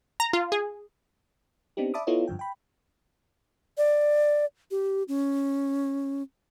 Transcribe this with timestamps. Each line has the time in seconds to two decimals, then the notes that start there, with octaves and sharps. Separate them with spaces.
0.20 A#5
0.33 F4
0.52 G#4
1.77 B3 C4 D4 D#4 G4
1.94 D5 E5 A5 B5 D6 D#6
2.07 B3 E4 F4 A4 C#5 D#5
2.28 G2 D3 F3 G5
2.39 G5 B5
3.78 D5
4.71 G4
5.08 C#4